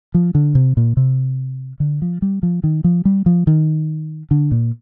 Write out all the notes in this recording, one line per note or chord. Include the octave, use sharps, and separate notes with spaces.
F3
D3
C3
A#2
C3
D3
F3
G3
F3
D#3
F3
G3
F3
D#3
D3
A#2